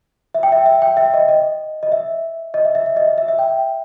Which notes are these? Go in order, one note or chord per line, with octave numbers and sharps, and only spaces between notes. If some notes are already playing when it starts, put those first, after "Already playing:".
E5
G5
E5
E5
G5
E5
D#5
D#5
D#5
E5
D#5
E5
E5
E5
D#5
E5
E5
E5
G5